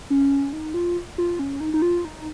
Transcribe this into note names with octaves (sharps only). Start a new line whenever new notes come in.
C#4
D#4
F4
F4
C#4
D#4
D#4
F4
D#4